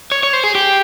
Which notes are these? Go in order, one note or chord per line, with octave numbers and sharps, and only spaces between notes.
C#5
C#5
C5
G#4
G4